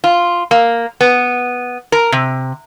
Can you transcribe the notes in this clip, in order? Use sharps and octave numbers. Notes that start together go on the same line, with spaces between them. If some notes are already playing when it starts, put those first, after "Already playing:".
F4
A#3
B3
A#4
C3